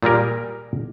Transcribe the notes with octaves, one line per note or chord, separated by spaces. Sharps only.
A#2 G3 G#4 A#4